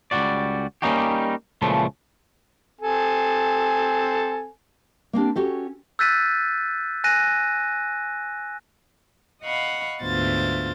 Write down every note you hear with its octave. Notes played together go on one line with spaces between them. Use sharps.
C#2 F#2 G3 F#4 D5
G3 A#3 C#4 D#4 F#4 G4
C#2 A#2 C#3 E3 F3 A3
C4 A4 G#5
A#3 C4 D4 G4
C#4 F#4 G4 A4
E6 F#6 G6 A6 B6 D#7
G#5 F#6 A#6 D#7
D#5 F5 F#5 B5 C#6
D2 G#2 B3 F4 C5 A6